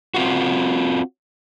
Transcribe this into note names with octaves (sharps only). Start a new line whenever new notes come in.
C4 F4 F#4